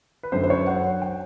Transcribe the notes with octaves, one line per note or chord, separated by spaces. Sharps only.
B4
F#2 D3 F#3 C5
C5
C#5
F#5
G5